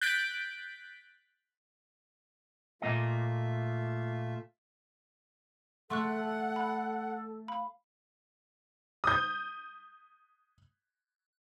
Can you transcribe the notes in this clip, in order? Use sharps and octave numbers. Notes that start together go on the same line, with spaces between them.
F#6 G6 A6 B6 D7
A#2 A3 A#3 F4 D#5 E5
A3 A4 F#5 C6 C#6 F#6
A4
B5
F5 B5
D#6 G6